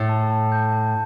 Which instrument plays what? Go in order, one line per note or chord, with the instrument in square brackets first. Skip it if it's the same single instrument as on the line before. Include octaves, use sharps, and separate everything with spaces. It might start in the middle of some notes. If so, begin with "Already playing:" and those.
Already playing: [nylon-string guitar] A2 A3
[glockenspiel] A5
A5
G6
A5